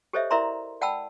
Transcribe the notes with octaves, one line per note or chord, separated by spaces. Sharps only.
G4 A4 C5 C#5 D#5 E5
E4 A#4 D5 E5 A#5 C6
D5 F#5 G5 A5 B5 E6